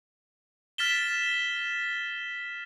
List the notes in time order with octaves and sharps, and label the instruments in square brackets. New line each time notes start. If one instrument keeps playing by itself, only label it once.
[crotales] F6 A6 B6 E7 G7